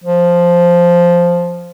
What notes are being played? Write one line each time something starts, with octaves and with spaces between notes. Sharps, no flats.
F3